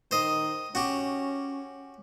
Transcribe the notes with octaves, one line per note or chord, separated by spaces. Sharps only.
D#3 C5 D#5
C#4 F#4 G4